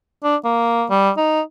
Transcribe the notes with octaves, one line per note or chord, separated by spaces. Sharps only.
D4
A#3
G3
D#4